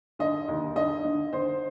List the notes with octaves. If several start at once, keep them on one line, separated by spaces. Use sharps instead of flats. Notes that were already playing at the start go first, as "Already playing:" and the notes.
D3 D#5
D#2
D3 D#5
D3
D3 C5